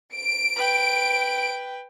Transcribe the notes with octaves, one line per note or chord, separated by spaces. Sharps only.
D7
B4 G5